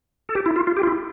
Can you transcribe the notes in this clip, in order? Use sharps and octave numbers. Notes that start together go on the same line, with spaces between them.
A4
G4
E4
F4
F4
G4
F4
E4